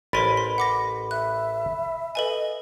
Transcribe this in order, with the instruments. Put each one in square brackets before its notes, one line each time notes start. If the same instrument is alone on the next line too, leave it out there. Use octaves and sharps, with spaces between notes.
[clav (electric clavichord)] A1 A#4 G#5 [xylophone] C5 C6 A6 [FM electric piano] B5
[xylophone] C6
F#5 D6 A#6
[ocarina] E5 [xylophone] F#6
[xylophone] A4 B4 G#5 [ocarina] D#5